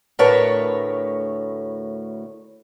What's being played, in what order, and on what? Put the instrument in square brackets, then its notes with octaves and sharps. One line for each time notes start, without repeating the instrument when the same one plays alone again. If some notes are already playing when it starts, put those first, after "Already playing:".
[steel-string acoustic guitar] D2 A2 A#4 B4 C#5 A5